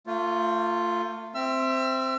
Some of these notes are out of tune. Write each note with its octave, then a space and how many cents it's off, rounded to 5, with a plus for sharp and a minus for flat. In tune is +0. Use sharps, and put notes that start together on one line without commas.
A3 +35 F4 +0
C4 +0 E5 +0 E6 +40